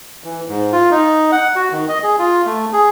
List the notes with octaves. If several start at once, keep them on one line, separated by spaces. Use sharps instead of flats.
E3
G#2
F4
D#4
F#5
F#4
D#3
D#5
G#4
F4
A3
G#4